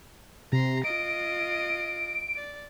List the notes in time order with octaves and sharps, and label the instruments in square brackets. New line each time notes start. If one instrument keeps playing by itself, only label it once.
[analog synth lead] C3 [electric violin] A#5 C6
[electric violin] F4 D#5 [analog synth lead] D7
[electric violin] D5